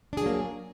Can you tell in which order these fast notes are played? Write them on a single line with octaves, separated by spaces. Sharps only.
D4 G#4 F#3 A#3